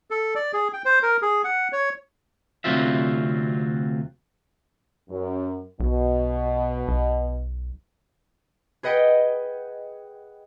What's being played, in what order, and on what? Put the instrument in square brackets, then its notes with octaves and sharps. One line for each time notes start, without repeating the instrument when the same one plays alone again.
[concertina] A4
D5
G#4
G5
C5
A#4
G#4
F#5
C#5
[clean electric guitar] D2 C3 F#3 C4 F4 E5
[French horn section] F#2
[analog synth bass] B1 [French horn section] B2
[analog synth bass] B1
[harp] G#4 B4 D#5 F#5 G5